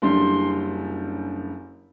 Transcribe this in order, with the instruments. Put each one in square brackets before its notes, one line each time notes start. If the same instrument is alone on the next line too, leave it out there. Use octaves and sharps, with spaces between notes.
[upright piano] F#1 F#2 D3 G3 D4 [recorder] C6